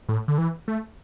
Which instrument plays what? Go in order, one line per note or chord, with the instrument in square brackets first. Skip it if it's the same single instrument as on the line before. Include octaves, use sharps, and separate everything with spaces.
[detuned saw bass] A2
D3
E3
A3